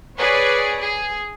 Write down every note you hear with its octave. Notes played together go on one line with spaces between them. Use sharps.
G#4 B4 C#5 D5
G#4